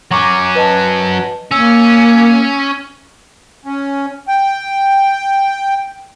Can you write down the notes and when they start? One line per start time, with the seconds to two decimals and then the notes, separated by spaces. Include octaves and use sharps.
0.11 F#3 C#4 A#5 C#6 D6
0.55 B4 D#5 A5
1.52 A#3 C#4 E6
3.65 C#4
4.28 G5